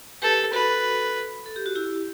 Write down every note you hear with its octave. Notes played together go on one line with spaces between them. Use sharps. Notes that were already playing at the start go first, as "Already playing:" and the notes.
G4 A4 B4
F#4 A4 B4
A4
G4
F#4
E4 G4